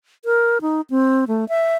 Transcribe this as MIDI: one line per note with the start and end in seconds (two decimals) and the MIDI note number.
0.25 0.58 70
0.61 0.81 63
0.90 1.25 60
1.28 1.48 57
1.49 1.76 76